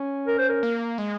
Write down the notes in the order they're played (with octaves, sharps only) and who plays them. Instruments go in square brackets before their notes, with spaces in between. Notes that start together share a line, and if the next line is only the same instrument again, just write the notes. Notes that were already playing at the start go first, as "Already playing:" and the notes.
Already playing: [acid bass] C#4
[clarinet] A#4
C5
A#4
[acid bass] A#3
G#3